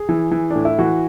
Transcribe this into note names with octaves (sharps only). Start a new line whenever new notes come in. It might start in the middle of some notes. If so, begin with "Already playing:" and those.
Already playing: G#4
E3
E3
A2 D4
E4
E3 F#4